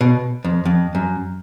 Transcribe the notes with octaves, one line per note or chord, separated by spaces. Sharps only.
B2
F2
F2
F#2